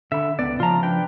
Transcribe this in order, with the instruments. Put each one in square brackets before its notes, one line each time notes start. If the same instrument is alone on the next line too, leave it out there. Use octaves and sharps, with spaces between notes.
[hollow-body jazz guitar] D3 B5 [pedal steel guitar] E5
[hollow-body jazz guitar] C#2 B3 B4 [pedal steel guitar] D5
[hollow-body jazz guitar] C#3 F3 A5 [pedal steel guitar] F4 A#5
[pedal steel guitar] D4 B4 G5